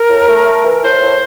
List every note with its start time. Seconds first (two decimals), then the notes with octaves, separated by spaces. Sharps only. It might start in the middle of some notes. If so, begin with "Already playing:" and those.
Already playing: A#4
0.08 A2
0.28 A3
0.45 A3
0.64 E3
0.82 A2 C5
1.01 A2